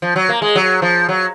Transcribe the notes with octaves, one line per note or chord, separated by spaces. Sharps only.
F3
F#3
A#3
G#3
F#3
F3
F#3